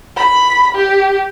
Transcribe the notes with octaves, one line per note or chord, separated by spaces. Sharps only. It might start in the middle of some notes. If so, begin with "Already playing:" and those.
B5
G4